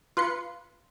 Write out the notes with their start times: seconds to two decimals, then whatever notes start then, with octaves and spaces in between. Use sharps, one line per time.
0.17 F4 B4 C6 C#7